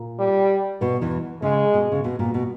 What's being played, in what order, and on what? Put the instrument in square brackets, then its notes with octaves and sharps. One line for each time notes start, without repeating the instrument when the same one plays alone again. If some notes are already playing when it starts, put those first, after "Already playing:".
Already playing: [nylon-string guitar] A#2
[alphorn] G3
[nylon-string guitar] B2 B3
E2 E3
[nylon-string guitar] C#3 [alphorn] G#3
[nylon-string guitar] B2
C#3
B2
A#2
B2